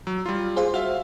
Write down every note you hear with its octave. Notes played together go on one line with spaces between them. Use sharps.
F#3
G3 F4
G#4 C5 F5
F#4 E5 F5